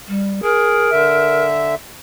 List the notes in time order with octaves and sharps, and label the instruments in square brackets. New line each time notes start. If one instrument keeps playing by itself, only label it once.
[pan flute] G3
[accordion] G#4 [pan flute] A#4
[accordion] D3 E5